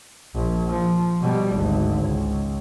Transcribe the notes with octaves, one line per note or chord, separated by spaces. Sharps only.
A#1
F3
B2 G3
G#1 D2
C#2